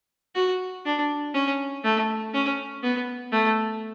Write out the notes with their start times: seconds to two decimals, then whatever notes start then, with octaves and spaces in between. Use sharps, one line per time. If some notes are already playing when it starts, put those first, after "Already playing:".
0.35 F#4
0.85 D4
1.34 C#4
1.84 A3
2.34 C#4
2.83 B3
3.33 A3